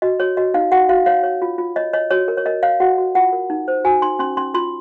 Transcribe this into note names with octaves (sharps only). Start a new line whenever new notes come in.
F#4 D#5
F#4 C#5
F#4 D#5
D#4 F5
F#4 F#5
F#4 F5
C#5 F5
C#5
F4
F4
C#5 D#5
C#5 D#5
F#4 C#5
A#4
C#5
A#4 D#5
C#5 F5
F#4 F#5
F#4
F4 F#5
A#4
D#4
C5
F#4 G#5
D#4 C6
C#4 C6
C#4 C6
F4 C6